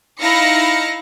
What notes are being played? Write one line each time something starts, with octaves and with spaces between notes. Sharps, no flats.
D#4 E4 F5 A#6 C#7